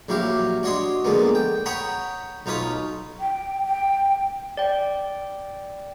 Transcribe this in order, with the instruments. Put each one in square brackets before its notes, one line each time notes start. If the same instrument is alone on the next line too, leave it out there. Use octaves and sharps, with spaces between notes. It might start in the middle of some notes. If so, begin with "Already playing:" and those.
[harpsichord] A#1 F#3 E4 G4 F5
D4 F#4 C#5 D#5 C6
D3 F3 G#3 A#3 B3
G5
C#5 F#5 G5 A#5 B5 D#6
B1 D#4 F4 C#5 B5 D#6
[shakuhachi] G5
G5
[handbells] D5 G5